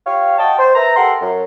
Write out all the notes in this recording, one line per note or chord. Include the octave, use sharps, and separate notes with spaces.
F4 G4 C#5 F5
F#4 D#5 G5 A5
C5
B4 E5 A#5
G4 A4 A#4 F#5 C6
F#2